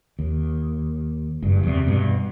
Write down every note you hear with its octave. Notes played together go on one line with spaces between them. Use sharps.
D#2
F#1 G2
E2 C3
G2 B2